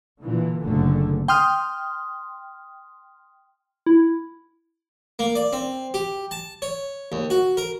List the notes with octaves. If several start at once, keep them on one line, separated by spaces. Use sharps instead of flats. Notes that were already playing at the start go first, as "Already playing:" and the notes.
A#2 D3 E3
F#1 A#2 D3 A3
G5 C6 D#6 F6
E4
A#3
D5
C4
G4
A5
C#5
D#2
F#4
A#4